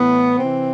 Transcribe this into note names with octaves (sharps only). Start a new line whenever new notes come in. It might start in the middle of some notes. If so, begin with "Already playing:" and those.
Already playing: A2 E3 B3
C3 E3 C4